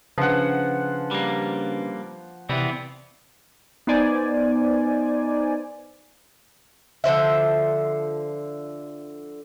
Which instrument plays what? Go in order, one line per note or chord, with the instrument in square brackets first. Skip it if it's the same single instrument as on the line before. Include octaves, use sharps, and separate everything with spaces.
[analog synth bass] C#3 [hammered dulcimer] F3 F#5 [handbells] C#4 D4 B4
[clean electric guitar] G3 A#3
[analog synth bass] C3 [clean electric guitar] E3 B3 C4 [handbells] D5 E5
[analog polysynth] B3 D#4 C5 D5 G#5
[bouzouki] D3 F3 C5 E5